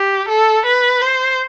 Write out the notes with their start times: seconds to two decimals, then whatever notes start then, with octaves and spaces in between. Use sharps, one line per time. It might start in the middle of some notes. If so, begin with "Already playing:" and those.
Already playing: G4
0.29 A4
0.66 B4
1.02 C5